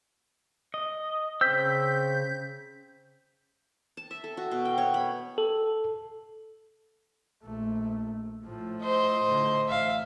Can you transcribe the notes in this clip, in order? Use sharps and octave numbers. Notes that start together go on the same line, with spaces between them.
D#5
C#3 C4 E6 G6 B6
A5
E5
A4
F#4
B2
G5
C#5
B5
A4
A#1 A3
A2 F3
C5 D#5
A2 D3
A1 E5 F5